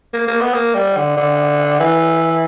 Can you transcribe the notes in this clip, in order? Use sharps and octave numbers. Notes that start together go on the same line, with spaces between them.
A#3
A#3
B3
A#3
G3
D3
D3
E3